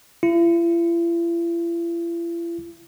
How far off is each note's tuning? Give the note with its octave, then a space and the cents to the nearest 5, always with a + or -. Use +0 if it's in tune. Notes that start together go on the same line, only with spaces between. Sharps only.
E4 +45